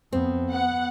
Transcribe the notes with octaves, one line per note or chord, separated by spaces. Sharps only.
F2 B3 C4
B3 F#5